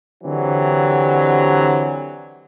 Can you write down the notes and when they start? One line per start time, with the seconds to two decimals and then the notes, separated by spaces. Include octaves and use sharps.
0.24 D3 E3 F#3 C4 G4